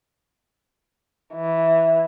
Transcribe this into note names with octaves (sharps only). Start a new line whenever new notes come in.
E3